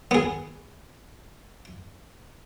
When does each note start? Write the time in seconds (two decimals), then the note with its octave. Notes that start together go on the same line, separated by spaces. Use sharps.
0.11 B3 G#4